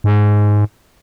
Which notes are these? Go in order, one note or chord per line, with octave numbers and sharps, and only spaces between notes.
G#2